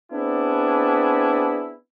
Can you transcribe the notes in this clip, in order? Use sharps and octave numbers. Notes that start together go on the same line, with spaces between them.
B3 C4 D4 E4 G#4